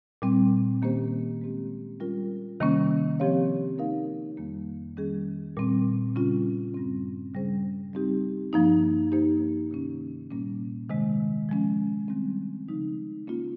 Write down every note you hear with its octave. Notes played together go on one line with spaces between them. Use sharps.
A#2 G3 C4
D#3 A#3 C#4 G4 C5
G#3 C4 G4
G3 C#4 F4 A#4
C3 D#3 G3 A#3 C#4
F3 C4 G4 C#5 F5
A#3 D#4 A#4 F5
F2 D#3 G3 A#3
D#3 G3 C#4 G#4
A#2 G3 C4
C#3 G3 C#4 F4
G2 G3 C4
C#3 G3 C#4 G#4 C5
G3 C4 D#4 G4
G2 F3 A#3 D#4
A#3 D#4 G4 C5
C3 D#3 A#3 C#4
A#2 G3 A#3 C#4
C3 D#3 G#3
F3 G#3 C#4
D#3 G3 C4
C#3 F3 G#3 D#4
A#3 C#4 F4